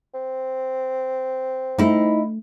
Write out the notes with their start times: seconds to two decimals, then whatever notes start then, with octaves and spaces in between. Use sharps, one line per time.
0.14 C4
1.78 A3 D#4 E4